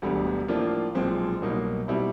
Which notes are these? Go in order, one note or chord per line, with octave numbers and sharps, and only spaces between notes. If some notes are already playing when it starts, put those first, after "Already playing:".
E1 D2 D3 G3 B3
A2 F3 A#3 D4 F4
B1 A#2 F3 G#3 C4
C2 B2 F#3 A#3 D#4
B2 G3 C4 E4